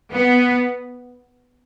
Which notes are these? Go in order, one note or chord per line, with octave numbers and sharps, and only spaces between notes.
B3